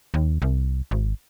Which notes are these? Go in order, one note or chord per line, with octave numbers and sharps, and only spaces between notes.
D#2
C2
G#1